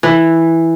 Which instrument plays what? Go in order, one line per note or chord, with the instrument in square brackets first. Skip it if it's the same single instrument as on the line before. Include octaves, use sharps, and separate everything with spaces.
[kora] E3